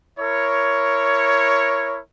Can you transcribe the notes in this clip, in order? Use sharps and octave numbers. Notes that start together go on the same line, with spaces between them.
E4 A#4 C#5